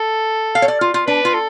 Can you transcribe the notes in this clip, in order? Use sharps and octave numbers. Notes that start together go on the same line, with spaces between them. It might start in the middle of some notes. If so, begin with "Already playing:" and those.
Already playing: A4
F5
C#5
D5
F4
F4
D4 B4
F4
A4